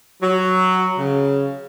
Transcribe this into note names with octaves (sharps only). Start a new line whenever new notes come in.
F#3
C#3